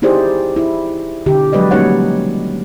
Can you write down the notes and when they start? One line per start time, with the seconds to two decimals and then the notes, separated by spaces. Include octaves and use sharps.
0.02 D#4 E4 G4 G#4 C5 D5
0.56 E4
1.26 B2 D3 G4
1.53 F3 F#3 G#3 B4 D5 D#5
1.71 G3 A#3 C#4 D#4 C#5 F#5